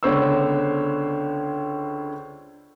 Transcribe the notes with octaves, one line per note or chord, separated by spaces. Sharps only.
C#2 D3 B3 C5 C#5 E6